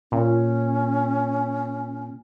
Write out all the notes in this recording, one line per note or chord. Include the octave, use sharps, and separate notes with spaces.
A#2 C#4